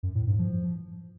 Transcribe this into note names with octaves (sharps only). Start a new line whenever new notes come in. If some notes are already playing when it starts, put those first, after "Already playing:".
F#2
A2
G2
F3